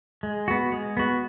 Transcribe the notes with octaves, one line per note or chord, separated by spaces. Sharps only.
G#3
B3 F#4
G#3
B3 F#4